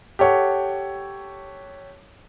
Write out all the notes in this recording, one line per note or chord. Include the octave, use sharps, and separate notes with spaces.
G4 A4 C#5 F#5